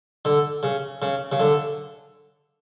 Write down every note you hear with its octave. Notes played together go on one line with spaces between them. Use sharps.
D3
C#3
C#3
C#3
D3